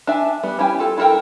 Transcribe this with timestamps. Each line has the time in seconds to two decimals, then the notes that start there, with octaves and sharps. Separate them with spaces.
0.07 D4 E5 G#5
0.43 G3 B3
0.59 C#4 E4 G4 G5 G#5
0.79 F4 A4
0.98 E4 F4 A4 A#4 G5